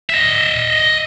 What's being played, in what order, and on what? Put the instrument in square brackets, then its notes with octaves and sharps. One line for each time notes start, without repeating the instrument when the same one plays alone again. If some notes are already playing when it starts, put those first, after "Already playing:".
[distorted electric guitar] D#5 E5